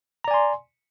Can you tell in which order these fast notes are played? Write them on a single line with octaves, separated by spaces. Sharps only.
A#5 D5 G#5 C6